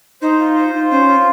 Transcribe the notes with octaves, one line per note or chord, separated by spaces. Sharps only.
D#4 C5
F4
C5
F4
C#4 C5
F4